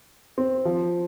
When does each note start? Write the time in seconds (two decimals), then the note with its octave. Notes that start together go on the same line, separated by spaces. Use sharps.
0.38 C4
0.65 F3